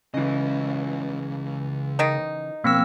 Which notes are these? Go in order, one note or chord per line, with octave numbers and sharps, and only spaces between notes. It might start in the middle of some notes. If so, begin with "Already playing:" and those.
C#2 C#3 E3 D#5
D#3 D#4
B2 F3 A#3 C4 E6